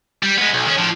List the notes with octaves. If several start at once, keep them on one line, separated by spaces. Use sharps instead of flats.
G3
G#3 B3
B1
D#3 C#4
A2 F3